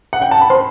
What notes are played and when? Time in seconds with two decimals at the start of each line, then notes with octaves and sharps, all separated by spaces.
0.13 F#5
0.22 G5
0.31 A5
0.41 B5
0.50 C5 C6